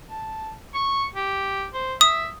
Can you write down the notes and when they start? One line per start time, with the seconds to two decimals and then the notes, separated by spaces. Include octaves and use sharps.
0.10 A5
0.74 C#6
1.15 G4
1.74 C5
2.01 E5 D#6